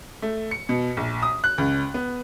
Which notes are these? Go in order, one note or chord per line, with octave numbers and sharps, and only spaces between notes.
A3
C#7
B2
A#1
D#6
F#6
C#2
B3